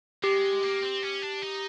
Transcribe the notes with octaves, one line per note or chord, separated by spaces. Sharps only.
G#3 G4
A#3
C4
C#4
D4
D#4